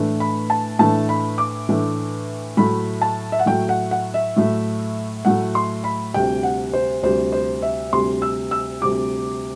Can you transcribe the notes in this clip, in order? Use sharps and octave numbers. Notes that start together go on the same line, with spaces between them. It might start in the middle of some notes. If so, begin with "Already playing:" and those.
Already playing: A2 E3 A3 D4
B5
A5
A2 E3 A3 D4 A5
B5
D6
A2 E3 A3 D4
A2 F#3 A3 B5
A5
E5
F#5
A2 F#3 A3 G5
F#5
F#5
E5
A2 F#3 A3
A2 F#3 A3 F#5
C6
B5
D2 C3 G3 G5
F#5
C5
D2 C3 G3 C5
C5
E5
D2 C3 G3 C6
E6
E6
D2 C3 G3 D6